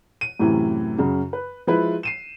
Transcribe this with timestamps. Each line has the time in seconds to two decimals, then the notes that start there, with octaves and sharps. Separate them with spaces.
0.21 D#7
0.40 F#2 A2 C3 E3
0.98 F#2 C#3
1.33 B4
1.67 F3 G#3 E4 B4
2.03 C7 D#7 E7